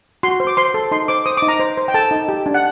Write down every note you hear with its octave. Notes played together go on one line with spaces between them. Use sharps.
F#4 C6
C5
D6
C5 C6
A4
D#4 C6
C5 D6
C5 D#6
D#4 D6
A#5
C5
C5
G5
A4 A5
D#4
G4
D4
F#5